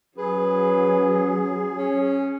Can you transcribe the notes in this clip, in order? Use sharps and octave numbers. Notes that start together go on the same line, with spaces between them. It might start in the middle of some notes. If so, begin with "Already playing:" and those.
F#3 C#4 G#4 B4
C#4